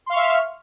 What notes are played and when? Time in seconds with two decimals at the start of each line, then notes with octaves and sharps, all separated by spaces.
0.06 C6
0.10 F5
0.13 C#6
0.16 E5
0.19 F6